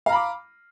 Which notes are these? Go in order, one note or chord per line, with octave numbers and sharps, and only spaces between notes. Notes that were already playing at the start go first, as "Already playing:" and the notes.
F5 A#5 B5 D6